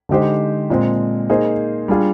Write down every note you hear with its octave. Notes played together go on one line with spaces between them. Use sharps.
D3 G#3 D#4 G4 C5
A#2 G#3 C4
A#3 D#4 G#4 C5
G3 D4 F4 G#4